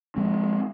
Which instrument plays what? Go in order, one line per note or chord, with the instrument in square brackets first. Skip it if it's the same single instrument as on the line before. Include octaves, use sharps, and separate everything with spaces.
[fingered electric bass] F3 G#3 C4